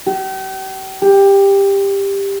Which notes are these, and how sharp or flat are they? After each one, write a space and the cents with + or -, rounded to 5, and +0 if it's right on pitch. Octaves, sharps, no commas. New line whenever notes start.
G4 -40
G4 +15